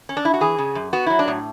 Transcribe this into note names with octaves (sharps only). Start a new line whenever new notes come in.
C#4
D4
E4
F#4
E3 G#4
C#3
F#2
B3 F#4
F#3 E4
D4
A2